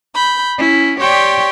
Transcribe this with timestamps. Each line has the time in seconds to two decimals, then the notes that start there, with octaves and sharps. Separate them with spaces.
0.15 B5 G6
0.58 C#4 E4
1.01 G4 C#5 D5 G5 C6 C#6